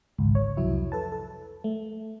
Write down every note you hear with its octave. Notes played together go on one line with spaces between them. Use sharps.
G#1 C#2 G#2
C#5
C2 F2 F#3 E4
A4 B4 A5
A4
A3